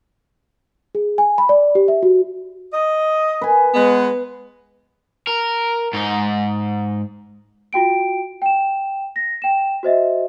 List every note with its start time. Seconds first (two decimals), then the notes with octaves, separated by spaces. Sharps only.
0.95 G#4
1.18 G#5
1.38 B5
1.49 D5
1.75 G4
1.88 E5
2.03 F#4
2.73 D#5
3.41 B4 G#5
3.74 G#3 B3
5.27 A#4
5.93 G#2 D#4
7.73 F4 F#4 G5 D7
8.42 G5 E7
9.16 A#6
9.42 G5 E7
9.83 F#4 C5 D#5 E5